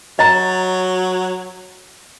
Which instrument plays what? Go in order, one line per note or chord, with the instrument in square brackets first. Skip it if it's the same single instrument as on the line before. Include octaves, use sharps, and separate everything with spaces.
[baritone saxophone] F#3 [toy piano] D#5 A#5